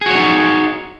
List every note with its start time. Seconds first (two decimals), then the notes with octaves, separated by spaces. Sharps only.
0.01 G#4
0.06 F#4
0.11 C#5
0.15 D#4